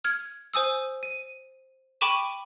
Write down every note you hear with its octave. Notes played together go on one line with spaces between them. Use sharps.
F6 G#6
C5 G#5 D#6 E6
D#7
G5 B5 C#6 D6 D#7 E7